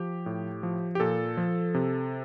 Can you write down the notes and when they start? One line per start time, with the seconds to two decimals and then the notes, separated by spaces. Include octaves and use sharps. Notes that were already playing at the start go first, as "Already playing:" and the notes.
Already playing: F3 G4
0.26 A2
0.63 F3
0.95 G4
1.00 A#2 A4
1.37 F3
1.74 C3